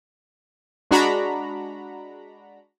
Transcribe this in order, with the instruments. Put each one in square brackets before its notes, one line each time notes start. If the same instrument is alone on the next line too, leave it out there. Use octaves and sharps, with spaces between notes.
[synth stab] G#3 D4 F#4 A#5 B5